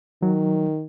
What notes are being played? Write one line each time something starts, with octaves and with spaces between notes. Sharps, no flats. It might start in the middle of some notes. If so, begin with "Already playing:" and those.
D#3 F#3